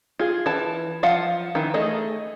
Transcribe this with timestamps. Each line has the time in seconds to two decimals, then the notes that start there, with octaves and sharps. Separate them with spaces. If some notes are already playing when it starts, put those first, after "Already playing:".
0.19 F4 G#4
0.46 E3 A5
1.03 F3 F4 F5 F#5
1.55 D#3 E3
1.74 A3 G#4 D#5